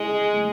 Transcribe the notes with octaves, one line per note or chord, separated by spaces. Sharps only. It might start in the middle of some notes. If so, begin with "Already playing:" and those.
Already playing: G#3 E4 G#4
A3